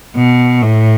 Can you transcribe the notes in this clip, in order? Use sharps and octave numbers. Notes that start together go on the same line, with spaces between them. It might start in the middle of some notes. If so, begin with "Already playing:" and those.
B2
A2